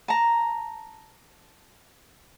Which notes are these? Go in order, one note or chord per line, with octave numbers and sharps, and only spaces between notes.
A5 A#5